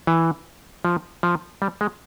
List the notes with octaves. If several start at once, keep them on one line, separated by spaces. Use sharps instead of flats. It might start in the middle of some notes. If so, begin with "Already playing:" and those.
E3
F3
F3
G3
G#3